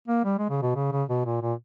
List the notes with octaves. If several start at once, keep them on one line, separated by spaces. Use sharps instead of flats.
A#3
G3
G#3
C#3
B2
C#3
C#3
B2
A#2
A#2